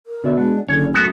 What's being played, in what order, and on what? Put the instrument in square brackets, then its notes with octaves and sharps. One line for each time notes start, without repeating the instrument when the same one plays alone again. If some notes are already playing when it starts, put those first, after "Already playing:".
[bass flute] A#4
[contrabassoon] B2 [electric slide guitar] D3 D5 E5
[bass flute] G#3 [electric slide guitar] D4 F#5
[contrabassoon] F#1 [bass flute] D3 [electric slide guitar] C#4 [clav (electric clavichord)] C#5
[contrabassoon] F#2 [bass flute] A3 [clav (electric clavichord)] B3 F#4